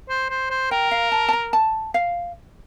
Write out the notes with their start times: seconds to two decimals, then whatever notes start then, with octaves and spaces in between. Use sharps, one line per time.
0.09 C5
0.30 C5
0.50 C5
0.71 A#4 G5
0.91 F5
1.12 A5
1.28 A5
1.33 A#5
1.53 A5
1.94 F5